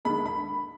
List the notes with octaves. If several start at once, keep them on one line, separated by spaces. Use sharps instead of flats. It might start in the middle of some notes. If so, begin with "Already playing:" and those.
D#2 D3 G#3 B5
B5